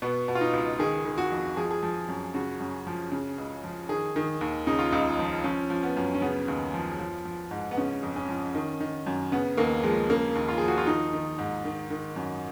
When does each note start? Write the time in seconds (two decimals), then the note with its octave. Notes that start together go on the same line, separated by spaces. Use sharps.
0.02 B2 B3
0.28 B2
0.35 F4
0.41 D#4
0.53 C#2
0.79 D#3 G#4
1.05 D#3
1.18 F#4
1.32 F2
1.57 F3 G#4
1.71 G#4
1.83 F3
2.08 F#2
2.34 C#3 F#4
2.60 F#2
2.87 F3
3.12 C#3
3.38 C#2
3.64 F3
3.89 D#3 G#4
4.16 D#3
4.41 D#2
4.67 C#3 D#4
4.79 F4
4.91 C#2 D#4
5.19 F3
5.44 F3 C#4
5.70 F3
5.83 B3
5.97 F#2
6.14 C#4
6.22 C#3 B3
6.48 D#2
6.74 F3
6.99 F3
7.25 F3
7.51 G#2
7.71 B3
7.77 C#3 C#4
8.03 F2
8.16 C#4
8.29 F3
8.55 D#3
8.80 D#3
9.06 F#2
9.32 C#3 B3
9.57 D#2 A#3
9.83 F3 G#3
10.09 C#3 A#3
10.35 D#2
10.48 F4
10.58 F3 G#4
10.68 F#4
10.78 F4
10.87 D#3 D#4
11.13 D#3
11.39 G#2
11.65 D#3
11.90 D#3
12.16 F#2